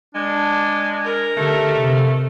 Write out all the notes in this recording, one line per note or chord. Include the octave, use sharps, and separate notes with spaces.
G#3 D4
A#4
D3 A3 D#4 G4 A4
C3